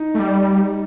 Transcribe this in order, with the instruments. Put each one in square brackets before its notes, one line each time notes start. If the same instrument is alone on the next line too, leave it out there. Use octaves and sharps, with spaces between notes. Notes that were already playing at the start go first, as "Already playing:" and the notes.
Already playing: [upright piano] D#4
[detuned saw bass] A3
G3